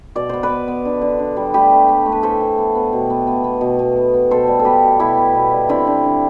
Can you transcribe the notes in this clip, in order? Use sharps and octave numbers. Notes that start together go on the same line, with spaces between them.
B2 D5
B3 C5
B4 D5
B3
B3
D3
D3
D3
G3
A3 G4 B4
A3
A3
A3
B4
E3 A4 C5
E3
B3
B3
B2
B3
B3
B3
B2
B2
B3
B3
B2 A4 C5
G3
A4
B3 G4 B4
B2
B2 E4 G4
B3
B2
G3
D3 C4 E4
D3
D3